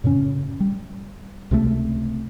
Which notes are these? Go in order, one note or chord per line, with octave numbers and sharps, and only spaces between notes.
F#2 A2 C#3 C#4
G3
C#2 C3 D#3 A3